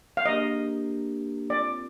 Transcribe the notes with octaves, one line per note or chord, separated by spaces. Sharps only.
F5
A#3 D4 G4 A#4 D#5
C4 F4 A#4 D5